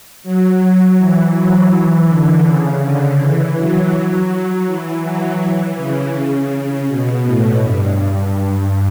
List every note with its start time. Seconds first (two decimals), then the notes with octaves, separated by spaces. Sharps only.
0.23 F#3
0.97 E3
1.33 F#3
1.71 E3
2.08 D3
2.44 C#3
2.81 D3
3.18 E3
3.56 F#3
4.66 E3
5.03 F#3
5.39 E3
5.76 C#3
6.14 C#3
6.88 B2
7.24 A2
7.61 G2